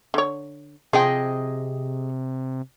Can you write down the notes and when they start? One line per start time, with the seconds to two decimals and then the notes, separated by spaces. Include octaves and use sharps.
0.14 D3 C#5
0.93 C3 F3 G#4 D#5 G5